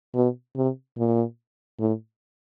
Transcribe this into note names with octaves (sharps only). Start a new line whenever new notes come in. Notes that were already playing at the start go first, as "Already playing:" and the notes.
B2
C3
A#2
A2